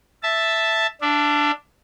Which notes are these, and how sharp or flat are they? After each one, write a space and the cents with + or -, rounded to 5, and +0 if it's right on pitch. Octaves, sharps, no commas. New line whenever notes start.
E5 +0 A5 +0
D4 +0 E5 +35